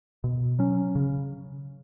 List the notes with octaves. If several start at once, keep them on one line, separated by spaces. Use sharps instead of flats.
B2
F#3 C#4
C#3